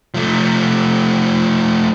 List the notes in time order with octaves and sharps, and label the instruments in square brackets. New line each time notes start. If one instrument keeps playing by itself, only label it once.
[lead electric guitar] F3 A3